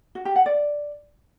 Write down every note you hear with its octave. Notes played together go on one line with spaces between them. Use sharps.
F#4
G4
F#5
D5